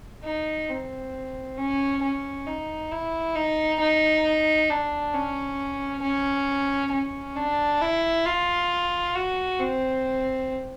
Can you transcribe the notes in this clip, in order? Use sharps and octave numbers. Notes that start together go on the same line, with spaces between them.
D#4
C4
C#4
C#4
D#4
E4
D#4
D#4
D4
C#4
C#4
C#4
D4
E4
F4
F#4
C4